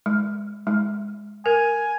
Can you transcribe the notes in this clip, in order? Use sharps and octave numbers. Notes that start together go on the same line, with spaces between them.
G#3
G#3
A#4 G#5